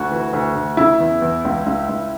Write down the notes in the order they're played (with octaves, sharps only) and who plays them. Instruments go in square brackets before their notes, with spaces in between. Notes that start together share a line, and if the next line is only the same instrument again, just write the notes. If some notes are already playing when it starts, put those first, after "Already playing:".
Already playing: [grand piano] D2 F#4
E3
D2
D2
C#3 E4
E2
E2
C#2
C#2
C#2